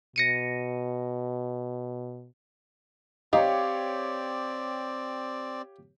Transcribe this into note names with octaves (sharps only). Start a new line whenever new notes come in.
B2 A#6 C#7 D#7
C4 D#4 G4 C#5 D5 F5